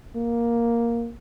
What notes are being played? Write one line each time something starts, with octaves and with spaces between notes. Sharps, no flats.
A#3